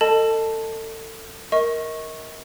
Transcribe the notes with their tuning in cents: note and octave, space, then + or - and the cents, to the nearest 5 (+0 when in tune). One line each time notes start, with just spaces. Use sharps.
A4 +30 D#5 -10 A5 +0
A#4 +0 D#5 +35 C#6 -15